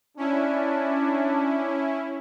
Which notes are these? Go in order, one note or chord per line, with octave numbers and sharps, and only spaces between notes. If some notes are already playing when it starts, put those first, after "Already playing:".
C#4 D4 E4